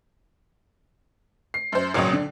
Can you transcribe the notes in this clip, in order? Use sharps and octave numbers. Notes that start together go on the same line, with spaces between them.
C7
F#2 C5
G#1 C#2 A#2 F#3 C#5 D#6
D3